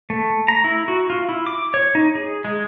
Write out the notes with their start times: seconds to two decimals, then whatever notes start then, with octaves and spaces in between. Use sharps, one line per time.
0.10 A3
0.48 A#5
0.64 E4
0.88 F#4
1.10 F4
1.29 E4
1.47 D6
1.74 C#5
1.95 D#4
2.15 G#4
2.45 G#3